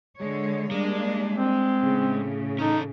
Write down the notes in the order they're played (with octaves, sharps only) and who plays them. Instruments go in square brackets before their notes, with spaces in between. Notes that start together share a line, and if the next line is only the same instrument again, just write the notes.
[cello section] D3 G#3 C#5
[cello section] G3 A#3 D4 [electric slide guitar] G#3
[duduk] C4
[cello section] A2 C#3
[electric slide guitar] C#4 A4 [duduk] D#4